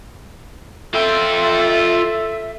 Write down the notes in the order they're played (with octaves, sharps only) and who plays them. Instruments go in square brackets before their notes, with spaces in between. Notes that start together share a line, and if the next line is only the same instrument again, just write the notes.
[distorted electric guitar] F4 G5 [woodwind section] A4 E5